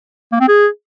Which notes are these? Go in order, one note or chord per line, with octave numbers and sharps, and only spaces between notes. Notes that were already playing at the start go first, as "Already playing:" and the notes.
A#3
C4
G#4